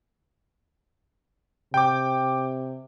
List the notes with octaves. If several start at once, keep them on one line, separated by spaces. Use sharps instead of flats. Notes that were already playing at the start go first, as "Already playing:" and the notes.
C3 G5 D6